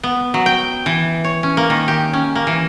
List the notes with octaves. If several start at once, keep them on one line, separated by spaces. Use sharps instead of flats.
B3
F#3
G5
E3
C#5
C#4
A#3
D#3
G4
C#4
A#3
E3